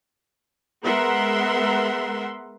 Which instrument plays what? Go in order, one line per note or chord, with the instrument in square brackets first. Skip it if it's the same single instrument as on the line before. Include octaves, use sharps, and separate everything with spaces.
[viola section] G#3 B3 A#4 E5 F#5 C6